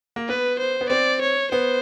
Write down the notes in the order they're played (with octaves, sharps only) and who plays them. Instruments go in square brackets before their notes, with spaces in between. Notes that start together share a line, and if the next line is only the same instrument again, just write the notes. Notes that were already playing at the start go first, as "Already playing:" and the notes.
[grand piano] A#3
[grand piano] B3 [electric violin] B4
[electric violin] C5
[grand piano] B3
[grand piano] C4 [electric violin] D5
[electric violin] C#5
[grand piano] B3 [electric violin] C5